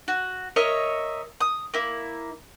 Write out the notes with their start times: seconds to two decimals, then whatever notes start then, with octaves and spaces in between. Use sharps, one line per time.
0.08 F#4
0.56 A#4 C#5 D#5 E5
1.40 D#6
1.74 A#3 E4